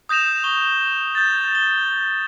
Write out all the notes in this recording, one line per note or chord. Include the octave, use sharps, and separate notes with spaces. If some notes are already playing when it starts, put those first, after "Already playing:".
D#6 G6 A#6 E7 F7
C#6 G7
G6 A6
G7